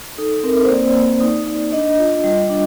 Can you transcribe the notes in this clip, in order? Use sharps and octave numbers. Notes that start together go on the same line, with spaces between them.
D#4 A4
C4 A#4
C5
A#3 D5
A#3
D#4
D#4
D4 D#5
F4
G3
D4